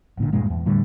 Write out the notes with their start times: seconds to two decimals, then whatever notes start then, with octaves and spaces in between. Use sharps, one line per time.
0.18 G#1 A#2 D3
0.33 D#1 G2 A#2 G#3
0.50 E2
0.66 A2 D3 G3